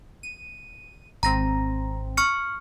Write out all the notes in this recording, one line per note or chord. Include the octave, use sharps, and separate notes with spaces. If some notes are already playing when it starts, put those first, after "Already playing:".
D#7
G#1 C4 A#5 A#6
C#6 F6 C#7